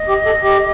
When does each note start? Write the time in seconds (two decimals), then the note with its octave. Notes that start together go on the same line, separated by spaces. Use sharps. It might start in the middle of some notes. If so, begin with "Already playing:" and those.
Already playing: D#5
0.09 G4
0.26 A4
0.43 G4